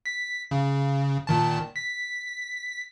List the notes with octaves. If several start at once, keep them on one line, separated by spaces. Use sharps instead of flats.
B6
C#3
A#2 D#3 A5
B6